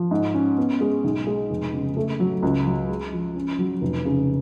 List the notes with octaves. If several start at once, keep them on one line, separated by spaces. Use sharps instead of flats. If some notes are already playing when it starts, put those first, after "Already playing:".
Already playing: F3
G#2
C#4
B3
G#3
B1
G#3
F1
C#3
A3
F#3
C#2
F#3
G#3
F3
C#4
F#3
F1
C#3